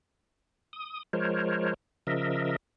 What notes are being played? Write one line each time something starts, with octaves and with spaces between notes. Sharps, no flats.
D#6
F3 G#3 A#4 C5 C#5
C#3 F3 A#4 D#5 E5